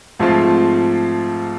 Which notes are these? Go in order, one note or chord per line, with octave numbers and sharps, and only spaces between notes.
G#2 F3 A3 C4 F4